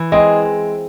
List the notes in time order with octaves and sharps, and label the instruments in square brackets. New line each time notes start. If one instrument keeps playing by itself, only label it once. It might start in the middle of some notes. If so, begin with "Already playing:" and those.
Already playing: [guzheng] E3 E4
[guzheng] G#3 C4 [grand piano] D#5